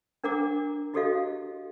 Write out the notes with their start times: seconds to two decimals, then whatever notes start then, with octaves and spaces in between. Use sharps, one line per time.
0.24 D4 A#4 F#5 A#5 D6
0.94 E4 F#4 G4 A4 D#5 F5